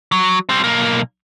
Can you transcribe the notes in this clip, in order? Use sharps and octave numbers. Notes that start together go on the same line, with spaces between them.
F#3
G3 C4
B1 A#3